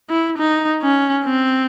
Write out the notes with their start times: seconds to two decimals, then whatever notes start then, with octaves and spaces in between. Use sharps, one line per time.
0.09 E4
0.38 D#4
0.82 C#4
1.25 C4